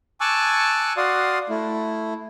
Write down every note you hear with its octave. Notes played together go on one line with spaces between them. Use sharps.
G#5 A5 C#6 D6 E6 F#6
F#4 D5 F5 C6 D#6
A3 E4